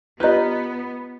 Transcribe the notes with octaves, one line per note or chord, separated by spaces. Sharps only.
B3 F4 G4 B4 D#5 A#5